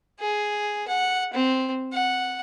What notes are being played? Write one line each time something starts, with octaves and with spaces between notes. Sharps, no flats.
G#4
F#5
C4
F#5